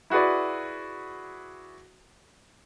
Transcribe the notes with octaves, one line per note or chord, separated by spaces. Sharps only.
E4 F#4 G#4 B4 D5